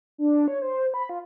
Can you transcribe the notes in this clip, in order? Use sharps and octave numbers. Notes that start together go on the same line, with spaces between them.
D4
C#5
C5
B5
F4